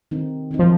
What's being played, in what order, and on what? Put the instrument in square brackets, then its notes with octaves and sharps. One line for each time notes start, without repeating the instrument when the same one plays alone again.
[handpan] D#3 C4 D#4
D#3 C4 D#4
[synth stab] F3